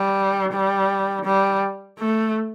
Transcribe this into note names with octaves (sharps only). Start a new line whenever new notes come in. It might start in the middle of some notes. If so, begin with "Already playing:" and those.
Already playing: G3
G3
G3
A3